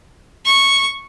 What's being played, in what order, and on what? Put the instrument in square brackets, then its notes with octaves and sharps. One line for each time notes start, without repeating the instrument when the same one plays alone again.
[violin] C#6